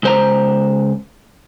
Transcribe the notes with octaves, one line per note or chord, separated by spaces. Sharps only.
C#2 C5 A#5